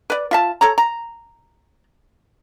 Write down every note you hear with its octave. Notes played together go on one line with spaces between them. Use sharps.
B4 D5
F4 E5 A5
A4 C#5 A#5
A#5